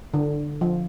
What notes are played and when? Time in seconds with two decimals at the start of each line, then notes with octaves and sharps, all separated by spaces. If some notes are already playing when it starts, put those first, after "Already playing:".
0.14 D3
0.61 F3